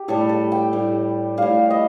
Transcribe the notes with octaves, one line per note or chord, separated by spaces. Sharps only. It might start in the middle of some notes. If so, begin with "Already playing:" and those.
Already playing: G4
A2 G3 A4
A4
G5
A2 G3
A2 G3 F5
D#5